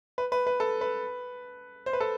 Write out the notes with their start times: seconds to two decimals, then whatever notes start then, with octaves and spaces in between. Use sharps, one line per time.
0.18 B4
0.32 B4
0.47 B4
0.60 A4
0.81 B4
1.86 C5
1.93 B4
2.00 A4